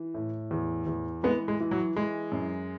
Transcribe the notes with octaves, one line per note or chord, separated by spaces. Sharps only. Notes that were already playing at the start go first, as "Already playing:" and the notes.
Already playing: E3
A2
E2
E2
E3 G#3 B3
G#3
E3
F#3
E3 G#3
F#2